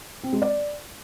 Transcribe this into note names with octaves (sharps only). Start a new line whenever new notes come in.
C4
G#3
D5